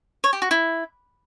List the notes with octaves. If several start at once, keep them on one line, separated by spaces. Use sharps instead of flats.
C#5
G4
F#4
E4